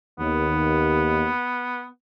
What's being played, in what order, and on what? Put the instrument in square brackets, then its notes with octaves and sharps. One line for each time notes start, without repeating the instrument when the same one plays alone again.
[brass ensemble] D#2 [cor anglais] B3